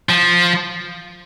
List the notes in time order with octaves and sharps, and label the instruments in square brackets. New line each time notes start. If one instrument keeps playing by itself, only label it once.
[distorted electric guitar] F3